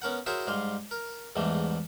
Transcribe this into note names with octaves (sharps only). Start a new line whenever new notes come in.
B3 C#4 A#4 F#5
E4 F#4 G#4 A#4 C5 C#5
G#2 G3 F5 C6
A#4
E2 G#2 E3 G3 A3